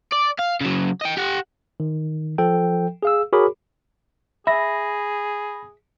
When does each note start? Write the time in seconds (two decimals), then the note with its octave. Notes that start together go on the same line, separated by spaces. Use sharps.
0.12 D5
0.39 F5
0.61 C#3 F#3
1.01 D#5 G5
1.17 G4 F#5
1.80 D#3
2.38 F3 A4 G5
3.03 G#4 F5 E6
3.33 F#4 G#4 A#4 C#5 B5 D6
4.47 G#4 E5 B5 A#6